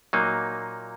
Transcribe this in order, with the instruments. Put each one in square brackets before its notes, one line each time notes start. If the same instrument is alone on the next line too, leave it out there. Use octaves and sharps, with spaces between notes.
[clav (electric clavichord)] A#2 F#3 A#3 D#4